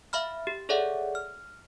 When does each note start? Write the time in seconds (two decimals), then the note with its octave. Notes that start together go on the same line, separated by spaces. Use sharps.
0.13 E5 F5 B5 F6
0.47 G4
0.69 G#4 A4 C#5 D5 E5 F#5
1.15 F6